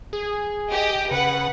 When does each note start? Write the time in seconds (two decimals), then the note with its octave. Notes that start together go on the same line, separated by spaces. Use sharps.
0.13 G#4
0.69 G4 D#5
1.11 C#3 B4 F#5